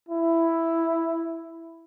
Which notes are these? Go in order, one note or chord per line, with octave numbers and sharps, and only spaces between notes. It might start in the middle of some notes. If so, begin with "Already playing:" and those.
E4